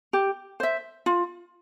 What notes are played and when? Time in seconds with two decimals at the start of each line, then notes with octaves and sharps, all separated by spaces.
0.13 G4
0.60 C5 E5
1.06 F4